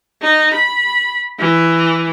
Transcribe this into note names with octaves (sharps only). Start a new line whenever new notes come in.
D#4
B5
E3